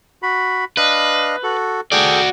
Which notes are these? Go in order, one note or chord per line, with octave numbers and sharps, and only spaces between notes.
F#4 B5
D4 B4 D#5 F5
F#4 A4
F#4 G#4 A4 D5 G5